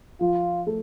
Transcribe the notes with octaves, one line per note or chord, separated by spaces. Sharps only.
F3 F4
A3